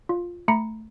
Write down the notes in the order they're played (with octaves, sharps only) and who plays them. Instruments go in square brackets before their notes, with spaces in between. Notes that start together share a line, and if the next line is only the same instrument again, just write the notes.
[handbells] F4
A3 A#5 B5 C#7